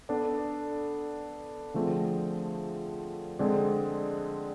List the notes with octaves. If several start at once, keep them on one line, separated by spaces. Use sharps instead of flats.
B3 D4 A4 D5
D3 F3 A3 C4 G#4
D3 G#3 C4 G#4 D5